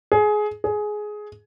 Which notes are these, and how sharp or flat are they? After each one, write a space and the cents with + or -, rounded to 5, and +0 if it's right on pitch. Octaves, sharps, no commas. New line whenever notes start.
G#4 +20
G#4 +15